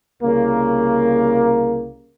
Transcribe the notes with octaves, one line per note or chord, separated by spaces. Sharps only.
C2 C#3 A#3